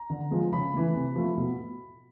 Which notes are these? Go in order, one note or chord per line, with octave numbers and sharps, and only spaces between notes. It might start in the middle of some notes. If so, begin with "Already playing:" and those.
Already playing: A#5
D3
F3 G#3
C#3 B5
E3 A3
C3
F3 A3
B2